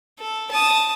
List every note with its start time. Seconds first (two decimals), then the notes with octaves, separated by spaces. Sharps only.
0.19 A4
0.51 A5 D#6